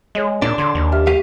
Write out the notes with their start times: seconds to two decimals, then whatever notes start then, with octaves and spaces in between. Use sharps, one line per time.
0.15 G#3 G#4 C#5 D#5
0.42 A#2 D4
0.58 D3 C6 G#6 C7
0.75 D#2
0.92 G4 E5 F6
1.07 A3 G4 F5 D#7